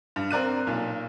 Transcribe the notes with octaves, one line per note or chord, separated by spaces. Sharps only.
G2
C4 A#4 D5 F#6 D#7
B1 A#2